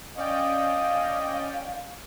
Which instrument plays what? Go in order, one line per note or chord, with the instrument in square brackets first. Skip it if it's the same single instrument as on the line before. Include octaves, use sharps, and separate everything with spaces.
[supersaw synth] C#4 D5 G5 [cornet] D#5 [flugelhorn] F5